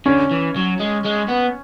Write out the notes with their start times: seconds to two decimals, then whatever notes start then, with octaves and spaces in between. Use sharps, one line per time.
0.06 D3 C#4
0.31 E3
0.56 F#3
0.80 G#3
1.05 G#3
1.28 B3